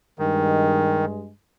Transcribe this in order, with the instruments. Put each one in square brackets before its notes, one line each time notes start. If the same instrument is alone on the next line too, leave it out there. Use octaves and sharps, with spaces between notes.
[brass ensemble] G2 G#3 [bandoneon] D#3